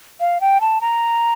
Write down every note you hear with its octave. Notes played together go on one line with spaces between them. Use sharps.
F5
G5
A5
A#5